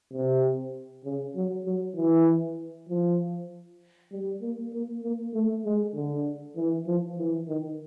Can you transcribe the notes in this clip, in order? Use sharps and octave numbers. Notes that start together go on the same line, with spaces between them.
C3
C#3
F#3
F#3
E3
F3
G3
A#3
A#3
A#3
A3
G#3
D3
E3
F3
E3
D#3